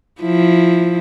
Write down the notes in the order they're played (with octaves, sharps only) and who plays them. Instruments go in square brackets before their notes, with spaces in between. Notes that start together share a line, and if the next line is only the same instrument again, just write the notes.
[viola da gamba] F3 E4